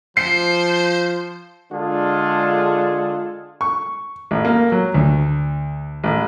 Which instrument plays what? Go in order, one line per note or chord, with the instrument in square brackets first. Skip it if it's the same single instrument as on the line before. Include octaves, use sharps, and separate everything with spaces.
[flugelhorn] F3 [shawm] C5 [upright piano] C7
[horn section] D3 G#3 D4 F4 G#4 A4
[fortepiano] C#6
A1
A#3
F#3
D2
A1